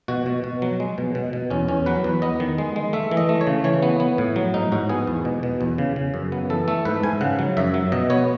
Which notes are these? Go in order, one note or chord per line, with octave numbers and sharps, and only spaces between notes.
B2 F#4
B2
B2
F#3
G#3
B2
B2
B2
E2 C#4
E2 C#4
F#3 B4
E2 B4
B3 D#5
D#3
G#3
G#3
A3 E5
E3
D#5
A3
C#5
C#3
E3 C#5
B3
B3
A2
F#3
G#2 D#4
G#2 F#4
B3 G#4
E2
B2
B2
E2
C#3
C#3
F#2
B3
E3 A4
A3 A4
G#2 B4
G#2 G#5
C#3 F#5
F#3
F#2 E5
F#3
B2 D#5
B3 C#5